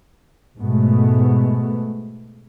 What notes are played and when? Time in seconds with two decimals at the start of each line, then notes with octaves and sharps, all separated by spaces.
0.59 G#2 B2 G#3 A3 B3